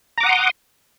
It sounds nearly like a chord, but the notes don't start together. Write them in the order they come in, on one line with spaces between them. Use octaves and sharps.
A#5 D6 F#5 D#6 C6